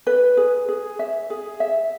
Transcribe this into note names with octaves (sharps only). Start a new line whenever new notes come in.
B4
G#4
G#4
E5
G#4
E5